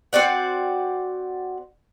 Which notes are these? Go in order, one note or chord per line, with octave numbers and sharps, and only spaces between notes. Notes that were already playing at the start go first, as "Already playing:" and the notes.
C4 F#4 D5 F#5